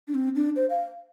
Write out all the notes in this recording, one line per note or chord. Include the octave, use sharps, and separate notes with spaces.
D4
C4
D4
C5
F5